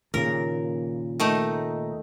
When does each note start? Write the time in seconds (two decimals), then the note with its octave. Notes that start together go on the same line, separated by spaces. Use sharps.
0.14 D#2 A#2 C#3 A#4
1.20 D#3 A3 D#4